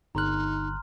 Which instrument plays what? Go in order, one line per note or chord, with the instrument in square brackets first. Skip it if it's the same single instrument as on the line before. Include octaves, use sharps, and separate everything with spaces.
[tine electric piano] G1 F#6 [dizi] D#4 [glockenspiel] A#5 C6 F6